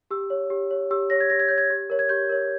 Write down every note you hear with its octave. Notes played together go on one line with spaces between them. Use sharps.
G4 E6
C#5
G4
C#5
G4 E6
C#5 A#6
G#6
G4 A#6
G#6
C#5 G6
G#6
G4
A#4 C#5
G#6
G4 G6
A#4 C#5